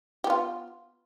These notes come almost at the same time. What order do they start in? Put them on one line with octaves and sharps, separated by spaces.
G4 B3 F4